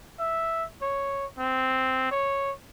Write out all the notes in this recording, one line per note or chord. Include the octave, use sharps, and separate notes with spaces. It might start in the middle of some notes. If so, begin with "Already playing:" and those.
E5
C#5
C4
C#5